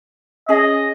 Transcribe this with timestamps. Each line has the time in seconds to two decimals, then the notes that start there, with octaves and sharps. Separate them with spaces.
0.49 C#4 G#4 D#5